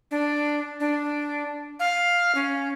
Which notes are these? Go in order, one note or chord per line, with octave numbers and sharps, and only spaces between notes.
D4
D4
F5
C#4